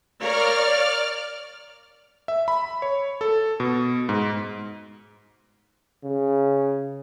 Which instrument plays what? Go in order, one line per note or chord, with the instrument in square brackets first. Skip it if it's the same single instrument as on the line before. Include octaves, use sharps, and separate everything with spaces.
[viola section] A#4 C#5 F5 [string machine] D5 F6
[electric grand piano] E5
B5
C#5
A4
B2
G#2
[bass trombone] C#3